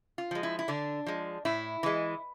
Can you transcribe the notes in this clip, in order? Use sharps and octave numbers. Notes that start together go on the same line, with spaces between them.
F4
F3 G#3
E4
E4
D3 D4
F3 G#3
A2 E4
E3 G#3